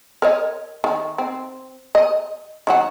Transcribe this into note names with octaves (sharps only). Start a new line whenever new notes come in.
A#4 C#5 D#5
D#3
C4
D#5
D#3 F#3 F#4